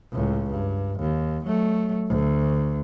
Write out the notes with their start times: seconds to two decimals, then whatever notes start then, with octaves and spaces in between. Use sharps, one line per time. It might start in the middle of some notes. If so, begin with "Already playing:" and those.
0.12 C#2 A2
0.50 G2
1.00 D#2
1.45 F#3 A3
2.08 D2